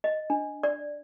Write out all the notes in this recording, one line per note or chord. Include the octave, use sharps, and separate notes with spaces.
D#5
D4
D5